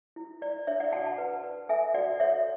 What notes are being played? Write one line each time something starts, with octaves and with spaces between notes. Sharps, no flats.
E4
E4 D5
D4 C#5 E5
D5 F#5
F#4 F#5 A5
F#5 A5
B4
B4
A4 E5 G#5
F#4 D5 F#5
A4 C#5 E5